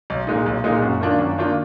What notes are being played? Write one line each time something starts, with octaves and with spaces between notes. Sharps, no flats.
B1
A#2 G#3 D#4
B1
A#2 G#3 D#4
F#2
D#3 A#3 D4 F4
F#2
D#3 A#3 D4 F4